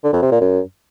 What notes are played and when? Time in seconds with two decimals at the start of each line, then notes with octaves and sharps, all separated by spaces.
0.04 D3
0.13 F2
0.22 C3
0.31 A#2
0.41 F#2